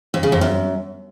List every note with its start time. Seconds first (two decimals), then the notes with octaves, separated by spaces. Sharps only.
0.14 F2
0.23 C#3
0.32 F2
0.41 F#2